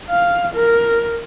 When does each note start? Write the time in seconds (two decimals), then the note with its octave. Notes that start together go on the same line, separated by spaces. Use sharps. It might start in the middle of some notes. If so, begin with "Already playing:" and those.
0.10 F5
0.54 A#4